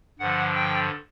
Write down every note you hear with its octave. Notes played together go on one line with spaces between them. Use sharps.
G2 D3 F3 F#5
G5